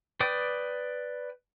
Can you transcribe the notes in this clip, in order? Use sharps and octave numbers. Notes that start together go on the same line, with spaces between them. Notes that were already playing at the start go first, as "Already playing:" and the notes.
B4 D5 G5 D6 D#6